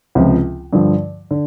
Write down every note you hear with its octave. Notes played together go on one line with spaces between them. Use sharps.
C#2 C3 F3
G2 D3 F3
D3